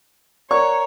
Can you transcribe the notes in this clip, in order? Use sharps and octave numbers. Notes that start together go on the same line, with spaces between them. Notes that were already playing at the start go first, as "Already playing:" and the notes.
A#4 C#5 D5 F#5 C#6